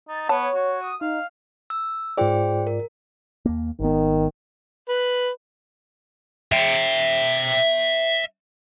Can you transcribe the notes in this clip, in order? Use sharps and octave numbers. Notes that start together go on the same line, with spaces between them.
D#4 A6
B3 C#5 A5
F#4
D#6
D#4 F5
E6
G#2 F4 G#4 C5 D5 G5
A#4
D#2 A#3
G#1 D#3 B3
B4
E5 G5